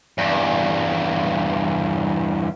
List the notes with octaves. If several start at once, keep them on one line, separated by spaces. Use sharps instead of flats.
E2 G2